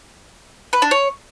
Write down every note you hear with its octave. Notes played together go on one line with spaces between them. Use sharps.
B4
D4
C#5